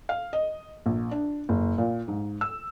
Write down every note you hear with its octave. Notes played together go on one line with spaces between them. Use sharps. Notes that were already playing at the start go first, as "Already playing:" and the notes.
F5
D#5
A#1
D4
F#1
A#2
G#2
E6